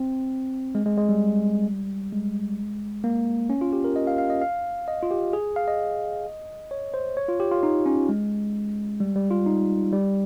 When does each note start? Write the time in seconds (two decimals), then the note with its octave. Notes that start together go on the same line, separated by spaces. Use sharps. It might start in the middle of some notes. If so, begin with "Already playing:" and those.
Already playing: C4
0.75 G#3
0.86 G#3
0.97 G#3
1.09 G3
2.12 G#3
3.04 A#3
3.50 C#4
3.61 F4
3.73 G4
3.84 A#4
3.96 D#5
4.07 F5
4.18 F5
4.30 D#5
4.42 F5
4.88 D#5
5.03 F4
5.11 G4
5.33 G#4
5.56 F5
5.68 D#5
6.71 C#5
6.94 C5
7.17 C#5
7.29 F4
7.40 G4
7.51 F4
7.63 D#4
7.86 C#4
8.09 G#3
9.00 G3
9.16 G3
9.31 F4
9.46 D#4
9.92 G3